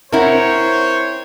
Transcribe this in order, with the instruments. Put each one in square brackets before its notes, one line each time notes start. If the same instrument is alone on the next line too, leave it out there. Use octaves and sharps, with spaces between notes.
[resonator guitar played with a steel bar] C4 E4 [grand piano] A#4 F#5 [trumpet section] C5 C#5